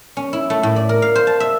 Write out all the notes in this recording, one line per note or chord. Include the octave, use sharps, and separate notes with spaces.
C#4
E4
A3
A2
D5
A#4
F5
C5
A5
E5